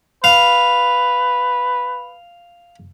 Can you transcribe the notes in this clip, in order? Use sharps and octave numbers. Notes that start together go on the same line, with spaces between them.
B4 F5